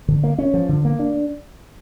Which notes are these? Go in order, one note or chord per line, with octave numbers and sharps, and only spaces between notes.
D3
A#3
C#4
F3
D3
A#3
D4